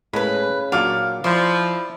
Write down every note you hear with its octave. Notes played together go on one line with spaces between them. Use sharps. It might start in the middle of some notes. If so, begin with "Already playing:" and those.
A2 C#3 G#3 B4 B5
A#2 F#3 D4 F5 D6
F3 E4 C5 D5